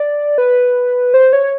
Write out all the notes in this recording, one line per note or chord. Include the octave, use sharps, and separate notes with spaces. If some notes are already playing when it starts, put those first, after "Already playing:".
Already playing: D5
B4
C5
C#5